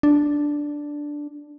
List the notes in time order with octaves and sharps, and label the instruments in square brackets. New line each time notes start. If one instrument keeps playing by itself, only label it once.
[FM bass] D4